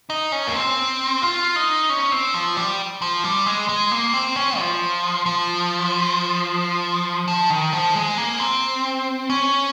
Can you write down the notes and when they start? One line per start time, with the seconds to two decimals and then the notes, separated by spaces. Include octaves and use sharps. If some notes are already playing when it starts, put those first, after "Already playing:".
0.10 D#4
0.32 C#4
0.47 A#3
0.55 C4
1.22 F4
1.56 D#4
1.89 C#4
2.12 C4
2.34 F3
2.57 G3
3.02 F3
3.24 G3
3.46 G#3
3.69 G#3
3.92 A#3
4.14 C4
4.36 C#4
4.59 F3
5.26 F3
7.28 F3
7.50 D#3
7.73 F3
7.95 G#3
8.18 A#3
8.40 C4
9.30 C#4